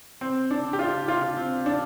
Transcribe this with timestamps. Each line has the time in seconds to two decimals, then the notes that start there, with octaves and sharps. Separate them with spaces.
0.21 C4
0.51 D4
0.73 G4
0.79 F4
1.08 F4
1.37 C4
1.66 D4